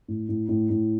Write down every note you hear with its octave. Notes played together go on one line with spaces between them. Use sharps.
A2
A2
A2
A2